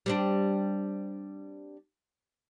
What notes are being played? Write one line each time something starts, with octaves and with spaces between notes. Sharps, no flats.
G3 C4 D4